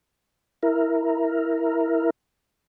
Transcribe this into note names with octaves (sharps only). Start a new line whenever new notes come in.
E4 A#4